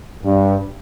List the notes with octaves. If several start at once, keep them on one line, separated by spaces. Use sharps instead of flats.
G2